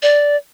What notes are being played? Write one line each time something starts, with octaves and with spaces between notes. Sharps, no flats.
D5